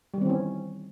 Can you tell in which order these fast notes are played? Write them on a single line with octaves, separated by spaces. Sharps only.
G3 D#3 C4 E3 C#4